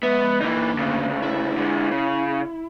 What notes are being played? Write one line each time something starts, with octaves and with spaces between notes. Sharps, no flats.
G#3 B3 E5
D3 E3 A#3 D#4
D2 C#3
E4
D3 G#3
C#3